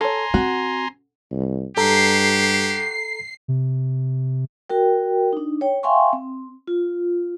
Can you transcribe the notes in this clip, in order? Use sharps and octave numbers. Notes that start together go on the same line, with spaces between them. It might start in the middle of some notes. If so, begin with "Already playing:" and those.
A4 C#5 G#5 A#5 C6
C4 F#4
C2
G2 F#4 G4 A4 A#5 C7
C3
F#4 A#4 G5
D4 D#4
C#5 G5
E5 F5 G5 G#5 C6 C#6
C4
F4